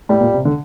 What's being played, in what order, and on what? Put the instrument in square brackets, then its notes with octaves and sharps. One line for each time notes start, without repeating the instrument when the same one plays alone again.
[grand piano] A2 [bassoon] G3
[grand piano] A#2
C3
D3